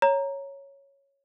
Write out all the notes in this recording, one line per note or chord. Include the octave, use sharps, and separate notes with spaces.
C#5 A#5